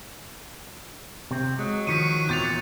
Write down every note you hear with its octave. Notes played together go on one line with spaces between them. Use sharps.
C3 C4
F#3 G#3
D#3 F3 B6 C#7 D#7
E2 A#2 C4 G6 A6 F7